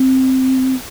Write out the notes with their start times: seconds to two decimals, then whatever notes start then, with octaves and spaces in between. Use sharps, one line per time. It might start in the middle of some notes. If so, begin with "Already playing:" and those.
Already playing: C4